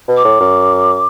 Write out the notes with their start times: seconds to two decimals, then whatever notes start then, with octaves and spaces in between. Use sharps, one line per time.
0.08 B2
0.17 D6
0.25 A2
0.40 F#2